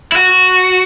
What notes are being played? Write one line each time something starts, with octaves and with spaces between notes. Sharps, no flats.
E4
F#4